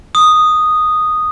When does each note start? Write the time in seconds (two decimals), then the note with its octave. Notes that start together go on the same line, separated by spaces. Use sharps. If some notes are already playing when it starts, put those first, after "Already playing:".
0.15 D#6